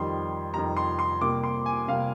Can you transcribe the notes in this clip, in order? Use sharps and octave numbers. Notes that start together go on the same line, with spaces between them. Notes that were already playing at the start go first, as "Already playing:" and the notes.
Already playing: F2 D#3 G3 C6
F2 D#3 G3 A#5
C6
C6
C3 G3 A#3 D6
C6
G#5
C3 G3 A#3 F5